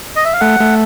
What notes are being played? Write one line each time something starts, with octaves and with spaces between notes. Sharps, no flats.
D#5
E5
F5
A3 F#5
A3